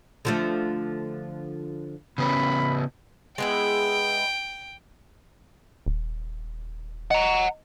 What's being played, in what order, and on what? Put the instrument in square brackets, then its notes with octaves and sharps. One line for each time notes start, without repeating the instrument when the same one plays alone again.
[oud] D3 F3 A3
[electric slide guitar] C#3 B3 C#4 [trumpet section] B5
[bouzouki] G#3 B3 E4 [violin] G5
[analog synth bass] D#1
[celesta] D#5 [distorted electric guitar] F#5 A#5